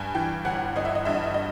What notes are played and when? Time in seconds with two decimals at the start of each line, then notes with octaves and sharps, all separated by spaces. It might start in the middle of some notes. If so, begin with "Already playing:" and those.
Already playing: G2 G#5
0.15 E3 G5
0.45 G1 F#5
0.76 G1 D#5
0.85 E5
0.95 D#5
1.05 G2 E5
1.14 D#5
1.24 E5
1.34 D#5